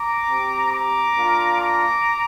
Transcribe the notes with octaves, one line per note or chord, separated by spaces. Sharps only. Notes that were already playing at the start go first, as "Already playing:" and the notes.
Already playing: A#5 D6
C4 G4
A#5 D6
A#3 D4 F4
A#5 D6